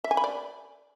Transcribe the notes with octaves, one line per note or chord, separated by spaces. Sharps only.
E5
G#5
B5
D5